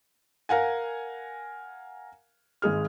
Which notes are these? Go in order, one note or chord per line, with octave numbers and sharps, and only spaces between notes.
A#4 F5 F#5 G#5
G#1 G#3 G#4 F6